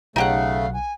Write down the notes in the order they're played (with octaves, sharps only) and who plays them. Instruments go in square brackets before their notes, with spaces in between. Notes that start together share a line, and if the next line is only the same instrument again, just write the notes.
[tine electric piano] B1 [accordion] C#3 A3 [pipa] D#4 G4 F#5 [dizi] F5
[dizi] G#5